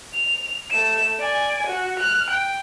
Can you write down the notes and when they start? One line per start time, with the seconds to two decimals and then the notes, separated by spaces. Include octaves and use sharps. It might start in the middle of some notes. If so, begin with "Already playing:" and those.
0.14 F7
0.70 A3 E7
1.19 D5 G#5
1.66 F#4
1.99 F6 F#6
2.30 G5